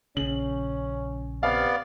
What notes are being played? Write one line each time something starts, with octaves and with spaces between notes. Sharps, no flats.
A#1 C#3 C#4 F#7
C3 B3 D5 F5